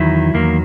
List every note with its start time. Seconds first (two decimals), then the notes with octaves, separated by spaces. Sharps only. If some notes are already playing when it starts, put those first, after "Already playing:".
Already playing: E2 D#3 F#3 E4
0.34 E2 D#3 F#3 A#3